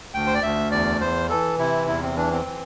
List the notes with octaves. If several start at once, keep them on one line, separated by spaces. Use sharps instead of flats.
D2 G5
C5
D5
D2 E5
E2 D5
E2 C5
E3 A4
C3 E4
E2 E4
C4
E3 D4
C4
E3